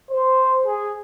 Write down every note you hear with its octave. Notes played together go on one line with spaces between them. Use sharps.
C5
G#4